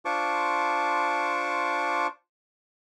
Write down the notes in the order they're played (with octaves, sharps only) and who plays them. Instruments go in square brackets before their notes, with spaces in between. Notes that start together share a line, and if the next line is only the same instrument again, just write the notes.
[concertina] D4 F4 C5 A5 C#6 D6